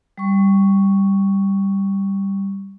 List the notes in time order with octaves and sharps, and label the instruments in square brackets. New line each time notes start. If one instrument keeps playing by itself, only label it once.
[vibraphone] G3 C#6